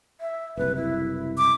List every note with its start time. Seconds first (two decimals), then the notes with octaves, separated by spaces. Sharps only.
0.21 E5
0.57 F#1 C2 B4
0.76 E4
1.38 D6